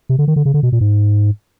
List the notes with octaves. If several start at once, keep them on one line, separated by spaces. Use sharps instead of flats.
C3
D3
D#3
D3
C#3
D3
B2
A#2
G#2